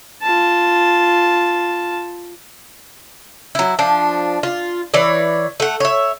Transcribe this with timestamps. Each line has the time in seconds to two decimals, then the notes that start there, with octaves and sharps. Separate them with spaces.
0.22 F4 A5
3.55 F#3 E4
3.79 F3 D4
4.43 F4
4.94 E3 C#5 D5
5.60 A3 F#5
5.80 C#5 E5